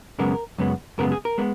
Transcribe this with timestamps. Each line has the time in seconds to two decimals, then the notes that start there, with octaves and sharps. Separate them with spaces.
0.19 F#2 C#3 G#3 B3 A#4
0.58 F#2 C#3 G#3 B3
0.98 F#2 C#3 G#3 B3 A#4
1.12 G#4
1.25 A#4
1.38 G#3 B3